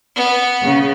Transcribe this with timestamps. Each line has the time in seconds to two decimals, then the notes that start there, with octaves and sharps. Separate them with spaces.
0.15 B3
0.62 C#3